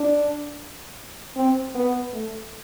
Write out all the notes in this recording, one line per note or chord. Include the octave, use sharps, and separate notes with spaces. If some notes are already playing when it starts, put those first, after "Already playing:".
Already playing: D4
C4
B3
A3